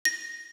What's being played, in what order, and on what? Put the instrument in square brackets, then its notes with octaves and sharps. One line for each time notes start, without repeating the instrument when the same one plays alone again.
[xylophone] A#6